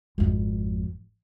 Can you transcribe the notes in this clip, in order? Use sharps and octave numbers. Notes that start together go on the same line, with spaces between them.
G#1 F2